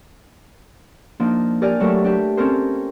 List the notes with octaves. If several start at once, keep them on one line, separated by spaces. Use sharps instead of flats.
F3 A#3 D4 D#4
G4 A#4 D5 G#5 F6
F#3 A3 A4 A#4 E5
D4 G4 E5
C4 C#4 A4 A#4 C5